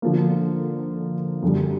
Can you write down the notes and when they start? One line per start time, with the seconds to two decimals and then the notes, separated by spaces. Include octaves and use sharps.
0.02 D3 F3 A#3
1.42 F#2 D3 G3